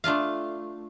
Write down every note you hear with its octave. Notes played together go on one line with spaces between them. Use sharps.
A3 D4 F4 F5